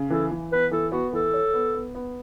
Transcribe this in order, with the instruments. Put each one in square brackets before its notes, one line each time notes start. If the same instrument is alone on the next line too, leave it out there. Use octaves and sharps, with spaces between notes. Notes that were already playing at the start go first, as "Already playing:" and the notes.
Already playing: [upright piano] C#3
[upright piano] E3 [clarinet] A4
[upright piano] E3
[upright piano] B3 [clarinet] B4
[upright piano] E3 [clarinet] A4
[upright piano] B3 [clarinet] F#4
[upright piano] E3 [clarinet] A4
[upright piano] C#5
B3
B3
B3